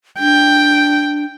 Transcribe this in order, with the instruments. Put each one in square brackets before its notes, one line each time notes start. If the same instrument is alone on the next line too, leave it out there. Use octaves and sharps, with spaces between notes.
[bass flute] D4 [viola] G5